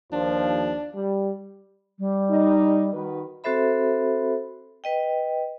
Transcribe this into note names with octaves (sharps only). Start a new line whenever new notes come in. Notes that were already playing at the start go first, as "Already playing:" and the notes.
D#2 F3 D4
G3
G3
D#4
D#3 F#4 B4
C4 F#4 A4 C5 E5 B5
B4 D#5 G5